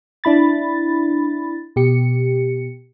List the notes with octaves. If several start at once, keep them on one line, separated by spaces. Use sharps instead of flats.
D4 E4 B5 A6
B2 G4 C#7